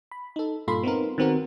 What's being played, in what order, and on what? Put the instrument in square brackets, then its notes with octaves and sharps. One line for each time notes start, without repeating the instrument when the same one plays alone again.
[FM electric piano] B5
D#4 A4
G2 A#2 F4 A4 B5 C6
B3 C4 D#4 A#4
D#3 B3 C4 F#4 A#4